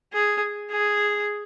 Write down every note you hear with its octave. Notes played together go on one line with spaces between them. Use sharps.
G#4
G#4